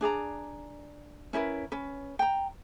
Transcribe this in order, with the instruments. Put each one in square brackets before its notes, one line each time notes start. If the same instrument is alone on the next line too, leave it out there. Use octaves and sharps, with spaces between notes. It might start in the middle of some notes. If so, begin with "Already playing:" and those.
[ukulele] D4 G#4 D5 A#5
C#4 E4 A#4 B4
C#4 B4
G5 A#5